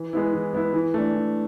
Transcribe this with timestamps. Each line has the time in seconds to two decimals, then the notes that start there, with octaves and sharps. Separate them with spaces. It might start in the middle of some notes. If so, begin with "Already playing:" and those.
Already playing: E3
0.13 G#3 B3 E4
0.33 E3
0.54 G#3 B3 E4
0.73 E3
0.94 A3 D4
1.14 E3